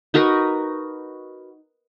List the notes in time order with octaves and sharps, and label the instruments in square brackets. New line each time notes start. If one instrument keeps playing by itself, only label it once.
[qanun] D#4 F#4 A#4 B4